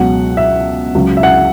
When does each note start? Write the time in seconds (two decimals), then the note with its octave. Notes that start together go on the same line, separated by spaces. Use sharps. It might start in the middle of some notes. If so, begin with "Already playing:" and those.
Already playing: C#2 B2 F#3 F#5
0.37 E5
0.94 C#2 C#3 F#3
1.17 E5
1.23 F#5